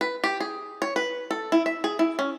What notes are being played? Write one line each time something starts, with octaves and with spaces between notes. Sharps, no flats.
B4
G4
G#4
C#5
B4
A4
E4
E5
G#4
E4
C#4